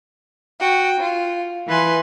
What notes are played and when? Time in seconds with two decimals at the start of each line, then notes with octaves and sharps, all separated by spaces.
0.60 F#4 G5
0.99 F4
1.67 E3 B4 G#5 C6